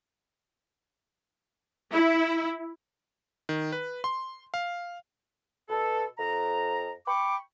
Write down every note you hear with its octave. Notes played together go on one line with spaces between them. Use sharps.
E4
D#3
B4
C6
F5
B2 A4
F2 A#5
G5 B5 C#6 D6